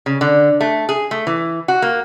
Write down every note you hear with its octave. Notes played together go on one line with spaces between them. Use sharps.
C#3
D3
A3
G#4
A3
E3
F#4
A#3